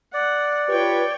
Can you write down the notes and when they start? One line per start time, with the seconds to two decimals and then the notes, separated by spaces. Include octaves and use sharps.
0.14 D5 F#5
0.68 F4 G4 B4 C#5 G5